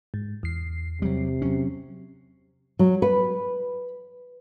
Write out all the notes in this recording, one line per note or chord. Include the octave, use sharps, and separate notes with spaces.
G#2
E2 C7
C3 F#3 G3
F#3 C#4
F#3
B4